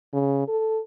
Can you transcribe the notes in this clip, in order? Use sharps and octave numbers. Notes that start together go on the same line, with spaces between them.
C#3
A4